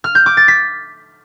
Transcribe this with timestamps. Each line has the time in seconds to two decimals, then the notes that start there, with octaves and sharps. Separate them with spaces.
0.04 F6
0.15 G6
0.26 D6
0.37 A6
0.48 B6